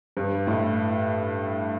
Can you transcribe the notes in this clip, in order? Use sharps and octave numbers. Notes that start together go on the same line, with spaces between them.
G2
A2